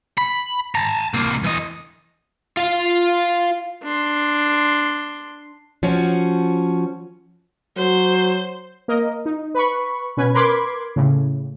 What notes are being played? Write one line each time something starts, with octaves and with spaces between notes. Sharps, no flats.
B5
A5 A#5
C2 A#3
E3 D#5
F4 F5
D4 C6
F3 C#4 F#4
F#3 C5
A#3 A#4 D#5
D#4
B4 B5 C#6
B2 C#4 B4 G#6
A#4 B4 B5 C6 D6 G#6
A2 C#3